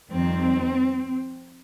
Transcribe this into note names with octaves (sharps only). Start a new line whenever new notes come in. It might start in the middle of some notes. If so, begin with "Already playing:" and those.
F2 D#3 G3 C4